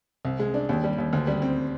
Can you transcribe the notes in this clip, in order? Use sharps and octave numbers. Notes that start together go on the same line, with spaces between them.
C2
G#3
D4
D#2
G3
D#2
D2
G3
C4